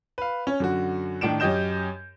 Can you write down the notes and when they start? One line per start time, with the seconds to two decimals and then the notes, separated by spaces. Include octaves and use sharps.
0.18 B4 F5
0.47 C#4
0.60 F#2 D3 F#4
1.21 A2 D#3 D4 D7 E7
1.40 F#2 C#4 G4 D#5 G6 E7